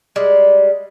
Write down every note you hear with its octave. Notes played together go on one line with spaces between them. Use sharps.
G3 G#3